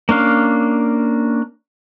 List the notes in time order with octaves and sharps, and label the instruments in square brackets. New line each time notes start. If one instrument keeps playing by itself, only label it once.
[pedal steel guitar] A#3 C#4 D4 F5